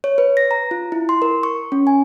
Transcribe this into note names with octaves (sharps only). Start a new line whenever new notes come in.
C#5
B4
A#6
A#5
F4
E4
C6
A#4
C#6
C#4
G#5